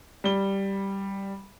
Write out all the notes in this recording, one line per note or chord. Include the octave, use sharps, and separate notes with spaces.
G3 G7